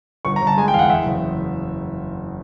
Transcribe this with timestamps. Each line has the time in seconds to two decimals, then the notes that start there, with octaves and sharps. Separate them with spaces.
0.25 G1 C#6
0.36 A#5
0.42 G1
0.47 A5
0.57 G#3 G#5
0.68 G5
0.73 E2 F5
0.79 F#5
0.89 E2 E5
1.05 F#1